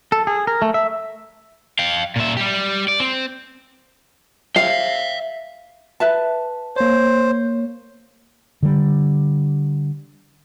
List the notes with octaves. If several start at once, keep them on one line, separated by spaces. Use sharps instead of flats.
A4
G#4
A#4
A3
E5
F5 G5
A#2 E5
G3 G4
D5
C4
E5 F5 G5
B4 E5 A5
A#3 C5 C#5
D3 G3